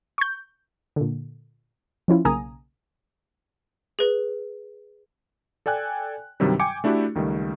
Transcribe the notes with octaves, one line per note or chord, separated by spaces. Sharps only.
C#6 G6
A#2 D3
F3 C#4 E4 F4
B1 C#3 A#3 G#5 A#5 D#6
G#4 B4
A4 D5 G5 G#5 F#6
G2 C3 D#3 F#3 G3
G5 G#5 D6 C#7
A3 D4 E4 F#4 G4 A4
C#2 D#3 G3 A3